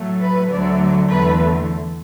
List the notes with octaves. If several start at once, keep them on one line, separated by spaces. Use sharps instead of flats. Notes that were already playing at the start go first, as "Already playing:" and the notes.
Already playing: A2 F#3 A3
B4
D2 D3 F#3 A3 D5
E2 D3 A3 B4